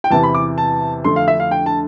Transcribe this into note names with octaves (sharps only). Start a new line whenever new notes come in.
G5
E2 C3 E3 A5
B5
D6
A5
F2 D3 A3 C6
F5
E5
F5
G5
A5